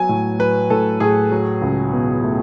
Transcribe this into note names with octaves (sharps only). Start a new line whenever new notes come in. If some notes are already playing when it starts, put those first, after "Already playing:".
Already playing: F#3 B3 G#5
A2
F#3 B4
A2 A4
A2 G#4
F#3
C#2
B2
A3